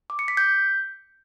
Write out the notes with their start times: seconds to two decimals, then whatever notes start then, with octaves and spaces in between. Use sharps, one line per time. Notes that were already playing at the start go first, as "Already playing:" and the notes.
0.10 D6
0.19 C#7
0.28 B6
0.37 G6